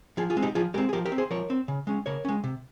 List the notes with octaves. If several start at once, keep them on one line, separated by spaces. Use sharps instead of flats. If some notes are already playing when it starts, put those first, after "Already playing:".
F3 F4 G#4
F4 G#4
G#3 C4
D#4 G4
F3 F4 G#4
G#3 C4 G4 A#4
G#4
F3 G4 A#4
G4 A#4
C4
G#4 C5
F3 A#4 C#5
C4
C#3
G#3 C#4
C#3 A#4 C#5
G#3 C#4
C3